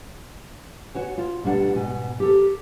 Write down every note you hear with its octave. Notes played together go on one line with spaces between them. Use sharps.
F#4 C#5 G#5
F4
D2 B2 G3 D4 F#5
G#2 B2 G#5
G4 A4 A#4